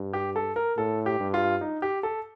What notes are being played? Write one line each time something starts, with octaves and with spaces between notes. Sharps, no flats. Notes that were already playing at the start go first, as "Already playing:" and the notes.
Already playing: G2
G4
A4
A#4
A2 A4
G4
G2
F4
D#4
G4
A4